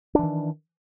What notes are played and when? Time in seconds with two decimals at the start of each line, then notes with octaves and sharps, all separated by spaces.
0.15 D4
0.19 E3
0.23 D#3